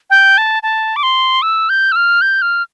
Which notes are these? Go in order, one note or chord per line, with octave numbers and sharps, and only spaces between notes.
G5
A5
A5
D6
C6
E6
G6
E6
F6
G6
F6